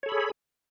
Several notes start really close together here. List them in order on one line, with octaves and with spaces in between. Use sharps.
C#5 A4 B5 G#4